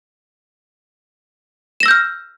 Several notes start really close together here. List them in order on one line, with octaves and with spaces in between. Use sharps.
E7 A#6 E6 G6 F6